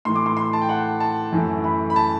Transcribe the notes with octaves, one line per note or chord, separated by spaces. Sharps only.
A2 E3 A3 C6
D6
C6
C6
A5
G5
F#5
A5
F#2 E3 A3
B5
B5
A5